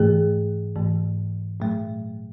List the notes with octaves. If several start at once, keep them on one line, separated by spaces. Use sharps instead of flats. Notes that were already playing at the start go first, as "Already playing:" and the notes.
Already playing: G#2 E3 A3 G#4
G#2 E3 A3
A#2 F#3 A3